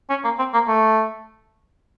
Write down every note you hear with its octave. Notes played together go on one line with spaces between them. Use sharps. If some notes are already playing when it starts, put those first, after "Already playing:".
C#4
A#3
C4
A#3
A3